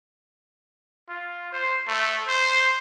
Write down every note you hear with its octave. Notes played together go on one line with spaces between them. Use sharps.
F4
C5
A3
C5